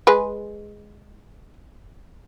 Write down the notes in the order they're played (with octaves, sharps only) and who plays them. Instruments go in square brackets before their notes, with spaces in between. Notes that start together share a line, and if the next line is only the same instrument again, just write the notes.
[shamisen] G#3 G#4 B4